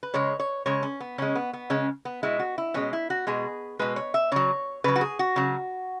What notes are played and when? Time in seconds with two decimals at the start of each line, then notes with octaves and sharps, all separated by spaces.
0.03 B4
0.14 C#3 G#3 C#5
0.40 C#5
0.66 C#3 G#3 C#5
0.83 C#4
1.00 B3
1.18 C#3 G#3 C#4
1.35 B3
1.53 B3
1.70 C#3 G#3 C#4
2.05 B3
2.23 B2 G#3 E4
2.39 F#4
2.58 E4
2.74 B2 G#3 C#4
2.93 E4
3.10 F#4
3.27 B2 G#3 G#4
3.79 B2 G#3 B4
3.96 C#5
4.14 E5
4.32 C#3 F#3 C#5
4.84 C#3 F#3 B4
4.96 F#4
5.01 G#4
5.19 F#4
5.36 C#3 F#3